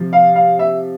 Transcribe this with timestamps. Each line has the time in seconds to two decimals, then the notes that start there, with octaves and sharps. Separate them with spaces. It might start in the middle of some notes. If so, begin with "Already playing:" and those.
Already playing: C3 F3
0.13 F5
0.35 F5
0.59 E5